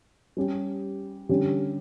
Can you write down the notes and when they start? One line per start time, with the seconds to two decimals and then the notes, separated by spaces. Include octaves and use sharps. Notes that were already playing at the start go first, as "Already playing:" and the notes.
0.37 G3 C#4 G4
1.29 D3 G3 C#4 G4